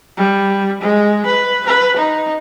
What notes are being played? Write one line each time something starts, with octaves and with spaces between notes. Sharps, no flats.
G3
G#3
B4
B4
D#4